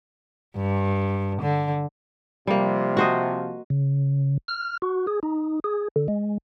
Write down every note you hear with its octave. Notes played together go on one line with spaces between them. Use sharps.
G2
D3
C3 F3 G3 A#3
F#4 C5 D#5
C#3
F6
F#4
G#4
D#4
G#4
D3
G#3